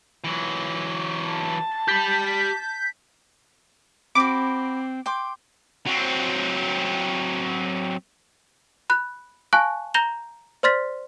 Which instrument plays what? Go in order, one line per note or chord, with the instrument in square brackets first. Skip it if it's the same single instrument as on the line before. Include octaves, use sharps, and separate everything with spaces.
[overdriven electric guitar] E3 F#3
[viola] A5
[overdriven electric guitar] G4 B5 [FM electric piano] G6 B6
[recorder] C4 [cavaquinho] F#4 B5 [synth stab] D6
[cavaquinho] G5 C6 D6
[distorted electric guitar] F#3 C4
[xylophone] B5 F#6
F5 G#5 A5 C#6 F#6
A#5 G6 A#6 F7 G7
C5 D5 C6 F6 A6 B6